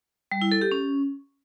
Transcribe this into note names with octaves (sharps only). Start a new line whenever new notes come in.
G3
E4
A4
G4
C#4